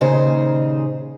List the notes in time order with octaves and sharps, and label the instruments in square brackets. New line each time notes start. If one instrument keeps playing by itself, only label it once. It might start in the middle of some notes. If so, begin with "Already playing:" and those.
[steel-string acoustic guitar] D#2 A#2 C#3 D#4 G#4 C5